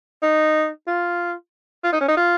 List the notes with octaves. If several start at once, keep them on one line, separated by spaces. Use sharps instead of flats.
D#4
F4
F4
D#4
C#4
D#4
F4